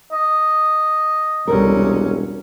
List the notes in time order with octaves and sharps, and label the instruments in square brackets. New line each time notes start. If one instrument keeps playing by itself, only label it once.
[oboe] D#5
[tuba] E1 [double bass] C2 C#4 [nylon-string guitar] G3 A4 A#4